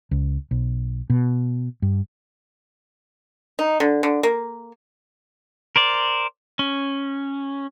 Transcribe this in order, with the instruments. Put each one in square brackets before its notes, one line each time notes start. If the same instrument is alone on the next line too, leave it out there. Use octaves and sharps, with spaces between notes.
[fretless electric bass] C#2
B1
B2
G2
[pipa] D#4
D3
D3
A#3
[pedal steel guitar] A#4 C5 D5
C#4